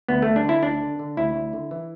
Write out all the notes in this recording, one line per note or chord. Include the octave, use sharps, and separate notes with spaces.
D2 B3
D2 A3
D4
D3 E4
D2 D4
D3
D3
D2 E4
D2
D3
E3